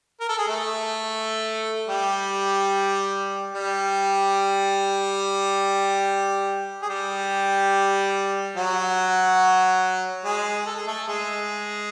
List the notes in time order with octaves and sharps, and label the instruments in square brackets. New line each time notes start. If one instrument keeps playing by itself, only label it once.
[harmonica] A#4
A4
G#4
A3 A4
G3 G4
G3 G4
G#4
G3 G4
F#3 F#4
G#3 G#4
A4
G#4
A3 A4
G#3 G#4